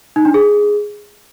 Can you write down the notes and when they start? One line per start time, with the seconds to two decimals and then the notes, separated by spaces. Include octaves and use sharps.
0.16 D#4
0.25 D4
0.34 G#4